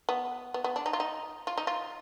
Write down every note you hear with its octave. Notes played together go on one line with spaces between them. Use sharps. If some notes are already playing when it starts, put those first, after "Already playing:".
B3
B3
B3
D4
D#4
F4
D#4
F4
D#4
F4